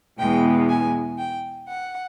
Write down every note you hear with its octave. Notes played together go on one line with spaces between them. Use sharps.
E2 B2 G#3 B3 G5
G#5
G5
F#5